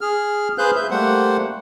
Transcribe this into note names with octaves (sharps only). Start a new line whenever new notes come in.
G#4 F6
G#4 B4 C5 F5 F#6 G6
E5 G6
G3 A3 A#3 C5 F#5